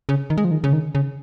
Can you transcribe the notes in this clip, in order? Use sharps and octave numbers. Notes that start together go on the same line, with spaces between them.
C#3
D#3
G#3
F3
D#3
C#3
D#3
C#3